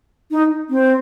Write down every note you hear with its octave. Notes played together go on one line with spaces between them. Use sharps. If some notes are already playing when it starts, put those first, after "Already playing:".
D#4
C4